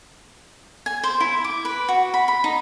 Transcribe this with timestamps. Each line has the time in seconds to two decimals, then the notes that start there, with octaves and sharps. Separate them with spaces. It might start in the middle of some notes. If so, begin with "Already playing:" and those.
0.86 G#5
1.04 C5
1.20 E4
1.44 D6
1.65 B4
1.89 F#4
2.14 B5
2.28 B5
2.44 D#4